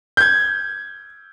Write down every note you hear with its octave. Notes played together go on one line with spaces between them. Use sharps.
G6 G#6